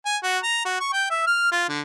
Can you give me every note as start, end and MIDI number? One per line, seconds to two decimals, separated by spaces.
0.06 0.17 80
0.23 0.38 66
0.43 0.63 82
0.65 0.79 66
0.80 0.93 85
0.93 1.08 79
1.10 1.26 76
1.27 1.50 89
1.52 1.64 65
1.69 1.81 50